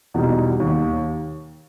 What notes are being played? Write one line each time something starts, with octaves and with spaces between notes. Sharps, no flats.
E2 B2 G3 D#4
D#2